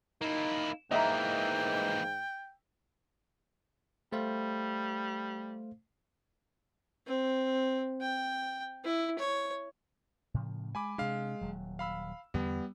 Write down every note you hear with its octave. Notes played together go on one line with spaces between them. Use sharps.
A#3 D#4 E4
G#2 E3 A#3 D#5 E5 G5 A#5
G3 A3 C5 F5
C4
G5
E4
C#5
A2 C#3 F3
G#3 G#5 B5 D6
C3 G#3 D4 F5
D#1 F#3
F5 B5 E6
E2 D3 G3 B3